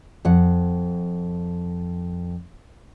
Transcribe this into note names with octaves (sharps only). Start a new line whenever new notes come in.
F2 F#5